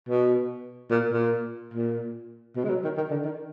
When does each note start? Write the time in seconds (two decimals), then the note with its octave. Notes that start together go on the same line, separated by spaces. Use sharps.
0.09 B2
0.91 A#2
1.12 A#2
1.74 A#2
2.56 B2
2.64 G#3
2.69 F#3
2.84 D#3
2.97 D#3
3.11 D3
3.24 D#3